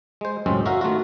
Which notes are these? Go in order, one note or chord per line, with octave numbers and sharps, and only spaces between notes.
G#3 C5
C#2 F#2 A2 G#3 C4 C#4
C#4 F#4 A#4 E5 F5
D#3 A3 D#4 F4 F#4